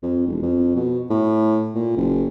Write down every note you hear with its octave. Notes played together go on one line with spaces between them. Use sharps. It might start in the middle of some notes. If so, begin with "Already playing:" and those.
F2
E1
F2
B2
A2
A#2
F#1